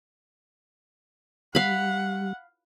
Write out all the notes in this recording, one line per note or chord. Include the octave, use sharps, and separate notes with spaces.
G3 F5 F#5 B5